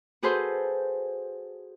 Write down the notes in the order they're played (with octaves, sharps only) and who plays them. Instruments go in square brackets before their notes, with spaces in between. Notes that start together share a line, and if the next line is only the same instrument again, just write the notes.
[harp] F#4 G#4 A4 B4 C5 C6